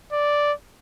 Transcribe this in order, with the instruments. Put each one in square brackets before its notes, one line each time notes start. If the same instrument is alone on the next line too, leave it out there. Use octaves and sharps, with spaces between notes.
[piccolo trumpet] D5